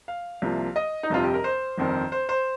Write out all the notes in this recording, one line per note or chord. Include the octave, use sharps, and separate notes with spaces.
F5
C2 C3 F3 A#3
D#5
D#4
G1 F2 C3 G3 C4 F4
G4
A#4
C5
G1 F2 D#3 C4
C5
C5